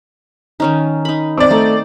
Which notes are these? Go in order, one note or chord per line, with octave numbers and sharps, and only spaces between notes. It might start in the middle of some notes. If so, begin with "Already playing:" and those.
D#3 C#4 D#4
D#4 B5
C4 D5 D6
A3 D#4